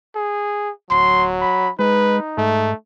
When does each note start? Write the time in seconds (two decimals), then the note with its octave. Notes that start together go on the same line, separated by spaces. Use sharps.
0.15 G#4
0.91 D1 F#3 C6
1.41 B5
1.79 G#3 D#4 B4
2.38 G#2 A3